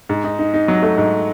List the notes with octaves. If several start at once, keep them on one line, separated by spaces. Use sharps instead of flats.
G#2
D#4
D#4
D#4
F#3
A3
G#2